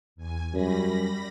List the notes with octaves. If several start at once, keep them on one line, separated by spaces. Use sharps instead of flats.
E2 G#5
F#2 G3 B5 A#6